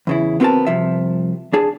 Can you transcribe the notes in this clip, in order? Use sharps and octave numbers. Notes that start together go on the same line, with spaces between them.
E2 C#3 E4
B3 C4 F#4 G#4 A#4 A5
C2 C3 F3 E5
D4 G#4 A5